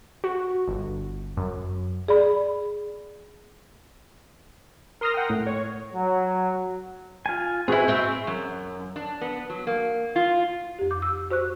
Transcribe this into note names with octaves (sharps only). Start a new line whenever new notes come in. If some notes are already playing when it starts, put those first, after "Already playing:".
F#4
G1
F#2
G#4 D5 B5
A#4 C6 D#6 F6 A#6
F#5 G5
A2
C#5
F#3
F4 G#5
C4 E4 F#4 G#4 B4
C4 E5 C#6
F#2
D4
B3
F#3
A#3
F4
F2 G4
D6 G6
E6
F#4 C5 C#6 F#6